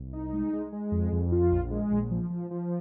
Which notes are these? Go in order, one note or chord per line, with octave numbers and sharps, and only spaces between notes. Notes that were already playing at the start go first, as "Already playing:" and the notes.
Already playing: C2
D#4
G#3
G#3
G#3
F2
F2
F4
A#1
G#3
A#1
F3
F3
F3